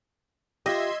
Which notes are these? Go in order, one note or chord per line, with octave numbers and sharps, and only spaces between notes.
F4 G4 D#5 E5 C6 G#6